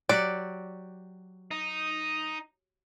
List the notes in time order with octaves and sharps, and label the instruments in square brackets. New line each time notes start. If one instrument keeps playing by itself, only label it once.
[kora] F#3 F#4 G4 [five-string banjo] D5
[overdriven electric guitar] D#4